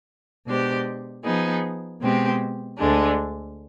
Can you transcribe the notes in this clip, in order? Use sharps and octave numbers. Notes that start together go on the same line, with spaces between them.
B2 G#3 D4 G4 C5
F3 B3 D#4 G#4
B2 G#3 C4 G4
D2 D3 G#3 D4